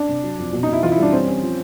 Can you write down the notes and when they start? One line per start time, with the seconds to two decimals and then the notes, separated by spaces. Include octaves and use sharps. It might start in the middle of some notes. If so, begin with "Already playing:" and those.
Already playing: D4
0.09 C3
0.23 F#3
0.38 F2
0.53 B2
0.63 D#4
0.68 B2
0.73 E4
0.83 E3 F4
0.92 E4
0.98 G3 D4
1.12 C4 C#4
1.27 C#4
1.43 F3